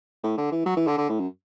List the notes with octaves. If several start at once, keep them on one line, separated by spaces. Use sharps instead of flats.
A2
D3
E3
F#3
E3
D3
D3
A2
F#2